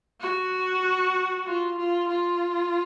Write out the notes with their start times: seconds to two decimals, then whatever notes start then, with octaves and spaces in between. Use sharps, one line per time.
0.20 F#4
1.46 F4
1.77 F4
2.09 F4